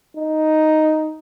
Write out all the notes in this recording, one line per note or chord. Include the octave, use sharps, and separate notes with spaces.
D#4